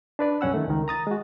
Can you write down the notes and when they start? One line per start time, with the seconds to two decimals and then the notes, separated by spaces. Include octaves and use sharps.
0.19 D4 B4 D5
0.41 C2 F#2 C#4 F#5 E6
0.54 D#3 A3
0.68 C#2 D#3
0.88 A#5 D#6 A6
1.07 G#3 F#4